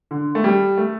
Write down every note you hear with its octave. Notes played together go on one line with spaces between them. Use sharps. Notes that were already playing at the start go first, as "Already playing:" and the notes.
D3
A3
G3
A3